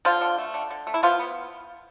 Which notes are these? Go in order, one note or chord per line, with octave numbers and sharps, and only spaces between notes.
D3 F3 F4
D3
A3
D3
D3
A3
E4
F3 B3 F4
B3